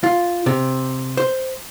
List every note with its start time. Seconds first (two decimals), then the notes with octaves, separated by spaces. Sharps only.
0.04 F4
0.46 C3
1.17 C5